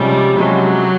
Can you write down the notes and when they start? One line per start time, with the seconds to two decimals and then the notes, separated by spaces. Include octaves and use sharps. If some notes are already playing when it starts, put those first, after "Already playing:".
Already playing: C3 F3 G3 G#3 C#4
0.36 C3 F3 F#3 G#3 C#4